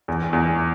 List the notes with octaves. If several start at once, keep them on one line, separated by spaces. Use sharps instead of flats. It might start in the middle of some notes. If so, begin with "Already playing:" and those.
E2
E2